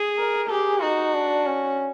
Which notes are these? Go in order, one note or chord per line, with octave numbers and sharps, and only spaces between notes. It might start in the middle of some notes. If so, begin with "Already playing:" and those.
Already playing: G#4
A#4
G4 G#4
D#4 F#4
D4
C#4